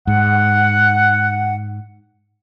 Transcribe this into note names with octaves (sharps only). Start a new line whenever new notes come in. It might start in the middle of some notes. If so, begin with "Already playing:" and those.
G#2 F#5